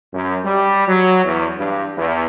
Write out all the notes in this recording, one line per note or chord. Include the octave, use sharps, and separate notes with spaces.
F#2
G3
F#3
E2
G2
E2